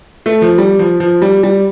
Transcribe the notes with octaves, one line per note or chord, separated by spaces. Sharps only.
A3
F3
G3
F3
F3
G3
G3